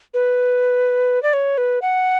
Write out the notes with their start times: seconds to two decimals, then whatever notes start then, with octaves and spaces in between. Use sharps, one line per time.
0.14 B4
1.23 D5
1.33 C#5
1.58 B4
1.82 F#5